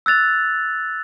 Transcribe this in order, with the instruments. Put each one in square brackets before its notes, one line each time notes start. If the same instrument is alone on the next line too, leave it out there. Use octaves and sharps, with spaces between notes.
[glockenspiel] E6 F#6 A6 F7